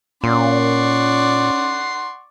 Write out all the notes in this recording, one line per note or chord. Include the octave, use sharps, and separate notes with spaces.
A#2 C#4 D5 F#5 C6 C#6